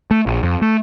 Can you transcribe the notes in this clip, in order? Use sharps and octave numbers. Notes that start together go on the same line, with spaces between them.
A3
A#1
F2
A3